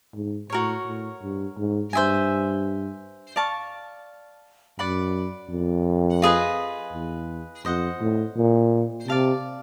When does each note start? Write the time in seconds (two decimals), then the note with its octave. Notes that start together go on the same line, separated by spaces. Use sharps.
0.14 G#2
0.50 A2 F#4 A#4 C#5
0.85 A2
1.22 G2
1.58 G#2
1.93 G2 C5 E5 G#5
3.36 D5 F5 A5 C#6
4.79 F#2 D5 F#5 B5
5.50 F2
6.22 F4 G#4 B4 D#5
6.93 E2
7.65 F2 C5 D#5 F#5
8.01 A2
8.37 A#2
9.08 C3 D5 F5 A5